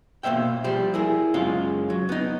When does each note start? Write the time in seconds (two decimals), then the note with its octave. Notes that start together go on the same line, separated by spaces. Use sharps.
0.23 B2 A#3 C5 E5 G5
0.64 F3 G3 C5
0.94 E4 G#4 A#4
1.34 C#2 F#2 G#3 C#4 F4
1.90 F#3
2.09 B3 D#4